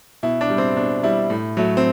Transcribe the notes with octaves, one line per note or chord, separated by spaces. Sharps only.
B2 E4
D4
G3
C4
B2 D4
G3 E4
A2
F#3 A3
C4